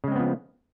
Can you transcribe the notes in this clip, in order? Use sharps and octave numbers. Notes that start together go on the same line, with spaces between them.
C#3 F3 G#3 B3 C4